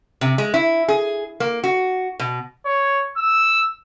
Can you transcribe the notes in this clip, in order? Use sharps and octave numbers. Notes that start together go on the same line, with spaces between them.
C3
G#3
E4
G#4
A#3
F#4
B2
C#5
E6